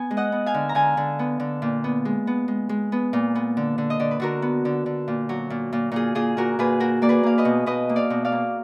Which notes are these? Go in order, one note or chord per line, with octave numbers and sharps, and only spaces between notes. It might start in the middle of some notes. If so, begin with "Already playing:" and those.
Already playing: B3 G#5
G#3
D#5 F#5
B3
F5 G#5
D3
A#5
D3 F5 G#5
D3
B3
D3
A#2
B3
G#3
B3
G#3
G#3
B3
A#2
B3
D3
D3
D#5
D3 D5
B4
D3 F#4 A#4
B3
D3
D3
A#2
F#3
A#2
A#2
A#2 F4 G#4
A#2 F4 G#4
A#2 F#4 A#4
A#2 G#4 B4
A#3 F#4 A#4
A#3 D5
G#4 B4
A#3 F5
B4 D#5
B2
B2 B4 D#5
A#3
D5 F5
B2
D5 F5
A#3